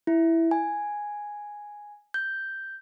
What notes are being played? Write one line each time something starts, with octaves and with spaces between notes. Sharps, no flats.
E4
G#5
G6